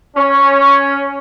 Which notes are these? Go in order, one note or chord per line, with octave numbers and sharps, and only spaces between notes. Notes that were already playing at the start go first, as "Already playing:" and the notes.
C#4